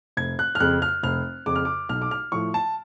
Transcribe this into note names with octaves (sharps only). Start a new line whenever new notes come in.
F1 G#6
F#6
F6
F2 C#3 F#6
F6
F1 F6
F2 C#3 D6
F6
D6
B1 F6
D6
F6
A2 F3 C#6
A5